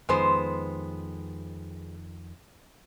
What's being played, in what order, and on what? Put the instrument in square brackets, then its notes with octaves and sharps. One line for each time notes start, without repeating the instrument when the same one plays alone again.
[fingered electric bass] F2 D#3 [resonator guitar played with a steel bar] G#3 B3 C5